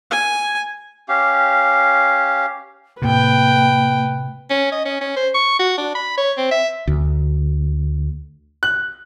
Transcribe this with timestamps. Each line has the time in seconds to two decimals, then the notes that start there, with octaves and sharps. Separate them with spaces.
0.11 G#5
1.09 C#4 G4 F5
3.02 A2 C3 A#3 B4 G5
4.50 C#4
4.72 D#5
4.85 C#4
5.01 C#4
5.16 C5
5.34 C#6
5.59 F#4
5.78 D4
5.95 B5
6.18 C#5
6.37 C4
6.51 E5
6.87 D2
8.63 F#6